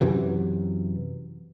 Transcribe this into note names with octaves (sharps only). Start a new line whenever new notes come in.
F#2 C3 E3 F#3